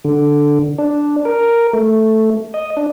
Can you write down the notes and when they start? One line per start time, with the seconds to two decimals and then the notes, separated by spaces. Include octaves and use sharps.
0.04 D3
0.78 D4
1.25 A#4
1.73 A3
2.54 D#5
2.77 D4